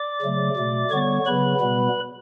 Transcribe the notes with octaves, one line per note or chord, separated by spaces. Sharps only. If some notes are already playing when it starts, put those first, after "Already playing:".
Already playing: D5 D6
C#3 F#3 A3
B2 A3
D3 G3 B3 C#5 C#6
C#3 F#3 B3 B4 B5
B2 G3 B3